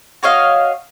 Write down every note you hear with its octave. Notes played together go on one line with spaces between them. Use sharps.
F#4 C#5 D#5 F5